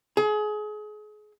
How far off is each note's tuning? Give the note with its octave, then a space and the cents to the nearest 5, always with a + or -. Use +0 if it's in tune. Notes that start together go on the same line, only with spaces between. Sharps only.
G#4 +30